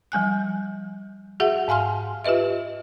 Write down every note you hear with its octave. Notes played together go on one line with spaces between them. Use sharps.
F3 G3 G#5 F#6
F#4 G#4 E5 F#5
G#2 F5 G#5 C6 F6
F4 G4 B4 D#5 E5